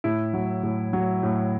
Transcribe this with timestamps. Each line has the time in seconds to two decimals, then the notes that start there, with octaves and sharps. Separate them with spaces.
0.04 A2 E4
0.34 F#3
0.63 A2
0.93 F#3
1.23 A2